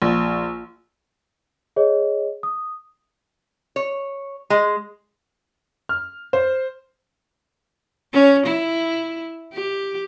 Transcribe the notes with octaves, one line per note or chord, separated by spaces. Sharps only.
A#1
G#4 C#5 D#5
D#6
C#5
G#3
F6
C5
C#4
E4
G4